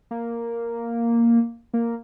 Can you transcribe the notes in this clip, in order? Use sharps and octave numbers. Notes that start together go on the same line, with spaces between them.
A#3
A#3